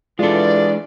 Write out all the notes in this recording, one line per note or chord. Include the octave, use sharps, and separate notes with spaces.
E3 G#3 D4 F4 A4 D5